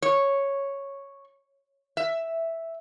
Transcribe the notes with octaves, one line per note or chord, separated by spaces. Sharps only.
C#5
E5